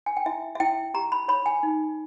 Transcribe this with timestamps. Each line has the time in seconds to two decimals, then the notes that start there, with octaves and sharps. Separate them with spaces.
0.06 G#5
0.17 G5
0.26 E4 E5
0.55 E5
0.60 E4 G5
0.94 G4 A#5
1.12 B5
1.28 C#5 B5
1.46 G#5
1.63 D#4